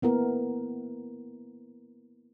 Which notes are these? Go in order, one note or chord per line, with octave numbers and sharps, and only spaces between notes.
A#3 B3 E4 A#4